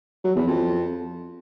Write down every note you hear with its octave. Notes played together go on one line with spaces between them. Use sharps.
F#3
E2
F2